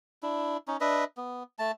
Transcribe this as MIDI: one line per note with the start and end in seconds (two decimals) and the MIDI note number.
0.23 0.57 62
0.23 0.57 64
0.68 0.77 61
0.68 0.77 63
0.81 1.04 62
0.81 1.04 71
0.81 1.04 75
0.81 1.04 76
1.17 1.43 59
1.59 1.72 57
1.59 1.72 81